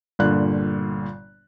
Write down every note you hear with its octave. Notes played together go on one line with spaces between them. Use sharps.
G1 A#2 D3 F#6